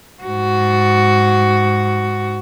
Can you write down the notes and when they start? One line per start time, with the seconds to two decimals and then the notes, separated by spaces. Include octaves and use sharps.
0.23 G#2 F#4